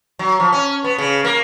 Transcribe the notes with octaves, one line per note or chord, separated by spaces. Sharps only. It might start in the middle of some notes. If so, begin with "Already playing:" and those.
F#3
F3
C#4
B3
C#3
A#3